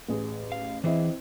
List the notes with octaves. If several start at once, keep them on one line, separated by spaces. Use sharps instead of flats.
A1 G#4
F5
E3 C4 E4 G#4 D#5